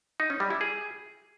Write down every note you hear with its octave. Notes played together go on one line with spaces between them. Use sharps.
D#4
C#4
G3
E4
G#4